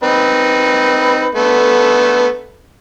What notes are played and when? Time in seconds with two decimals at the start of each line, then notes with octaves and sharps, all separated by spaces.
0.03 C4 D#4 B4
1.35 D3 A3 B3